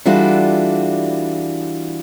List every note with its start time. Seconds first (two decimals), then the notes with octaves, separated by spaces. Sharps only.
0.05 E3 G3 D4 F4 F#4 A4